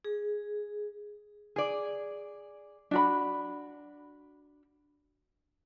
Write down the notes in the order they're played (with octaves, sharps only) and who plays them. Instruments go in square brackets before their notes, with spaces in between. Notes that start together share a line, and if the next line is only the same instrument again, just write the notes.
[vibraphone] G#4
[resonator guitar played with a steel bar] G#4 D5
[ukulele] D4 F#4 B5